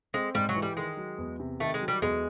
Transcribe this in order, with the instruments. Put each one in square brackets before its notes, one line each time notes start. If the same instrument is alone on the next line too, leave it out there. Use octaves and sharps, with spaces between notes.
[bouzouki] G#3 [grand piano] C4
[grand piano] G#2 [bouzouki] G3
[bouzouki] F#3
[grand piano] E3
[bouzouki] G3
[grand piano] D#3 [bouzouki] G#3
[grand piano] F#3
E2
C3
[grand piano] D#3 [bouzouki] A3
[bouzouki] G#3
[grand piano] F#3
[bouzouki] G3
[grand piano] E2 [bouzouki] G#3